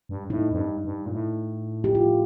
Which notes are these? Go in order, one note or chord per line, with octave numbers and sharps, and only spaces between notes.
G2
A2 D#4
F2
G2
G2
A#2
A2
G4
F4